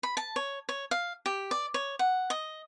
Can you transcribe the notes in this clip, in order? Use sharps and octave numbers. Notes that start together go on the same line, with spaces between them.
B5
A5
C#5
C#5
F5
G4
D5
C#5
F#5
D#5